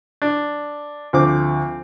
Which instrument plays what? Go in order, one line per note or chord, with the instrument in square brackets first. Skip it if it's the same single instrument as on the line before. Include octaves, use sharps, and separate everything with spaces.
[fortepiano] D4
[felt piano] D2 [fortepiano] F3 C4 D6